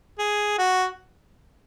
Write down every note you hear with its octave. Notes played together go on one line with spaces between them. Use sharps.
G#4
F#4